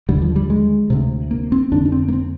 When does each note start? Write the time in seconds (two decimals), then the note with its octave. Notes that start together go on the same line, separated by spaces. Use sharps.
0.09 D#2 D3 G3
0.22 F3
0.36 G3
0.50 G#3
0.90 D2 C3
1.31 A#3
1.52 C4
1.72 F2 D3 D4
1.85 D4
1.92 C4
2.08 A#3
2.13 C4